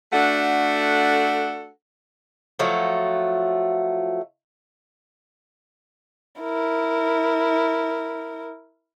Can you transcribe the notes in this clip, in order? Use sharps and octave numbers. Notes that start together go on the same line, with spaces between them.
A3 D4 F#4 A4 F#5
F3 F#3 A3
E4 A#4